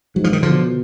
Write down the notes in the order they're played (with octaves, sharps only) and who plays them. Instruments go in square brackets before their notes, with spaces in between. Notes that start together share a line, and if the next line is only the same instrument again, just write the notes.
[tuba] G#2 [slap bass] F#3
[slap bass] F3
D#3
[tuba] B2 [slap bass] D3 F3